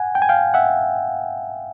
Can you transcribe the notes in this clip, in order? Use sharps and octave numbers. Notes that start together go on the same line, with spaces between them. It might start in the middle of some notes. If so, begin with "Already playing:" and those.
Already playing: F#5 G#5
G5
G#5
F5 G5
E5 F#5